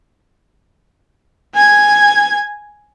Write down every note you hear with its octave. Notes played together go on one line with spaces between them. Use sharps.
G#5 G#6